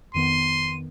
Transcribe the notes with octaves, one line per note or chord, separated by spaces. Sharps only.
F2 D#3 B3 C6 D#7